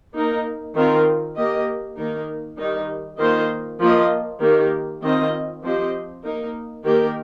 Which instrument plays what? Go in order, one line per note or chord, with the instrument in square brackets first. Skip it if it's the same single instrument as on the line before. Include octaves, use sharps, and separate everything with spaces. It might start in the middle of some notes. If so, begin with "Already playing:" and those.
[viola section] A#3 D#4 A#4
D#3 C4 F4 A#4
A#3 G4 D#5
D#3 A#3 D#4 A#4
D#3 G3 D#4
D#3 A#3 F4 C5 D#5
F3 A#3 F4 D#5
D#3 A#3 G4 A#4
D#3 C4 F4 D#5
F3 C4 G4 C5 D#5
A#3 D#4 A#4
D#3 A#3 G4 A#4